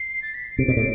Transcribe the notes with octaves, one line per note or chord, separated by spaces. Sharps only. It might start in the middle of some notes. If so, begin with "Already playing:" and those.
Already playing: C7
A6
B6
C7
C3 D7
B2
A2